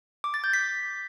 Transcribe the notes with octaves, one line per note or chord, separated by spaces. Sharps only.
D6
A6
G6
B6